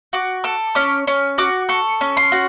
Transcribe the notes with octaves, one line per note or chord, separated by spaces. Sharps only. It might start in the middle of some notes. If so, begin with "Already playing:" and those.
F#4 D6
A4 D6
C#4 D6
C#4
F#4 D6
A4 C#6
C#4
C6
F#4